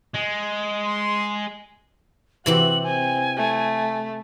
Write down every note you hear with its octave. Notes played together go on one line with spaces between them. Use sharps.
G#3
C6
C3 E3 F#4 G4 F#7
C4 G#5
A3